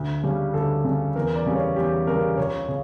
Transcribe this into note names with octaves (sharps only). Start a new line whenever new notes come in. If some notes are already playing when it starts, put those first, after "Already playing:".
Already playing: D2
C#3 G3 C#4
D2 A4
C#3 G3 C#4
E2 A#4
D5
C#3 G3 C#4
C#5
E2 G4
C#3 G3 C#4 A#4
C#2 C#5
C#3